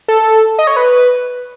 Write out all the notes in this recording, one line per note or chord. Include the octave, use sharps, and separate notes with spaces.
A4
D#5
C#5
B4